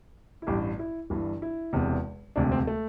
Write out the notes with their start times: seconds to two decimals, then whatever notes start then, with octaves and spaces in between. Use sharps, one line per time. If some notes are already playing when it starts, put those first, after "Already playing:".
0.42 E4
0.47 A1 G2 E3 G4
0.79 E4
1.10 G1 G2 E3
1.42 E4
1.73 E1 E2 C3
2.36 E1 D2 C3 D4
2.52 C4
2.67 A3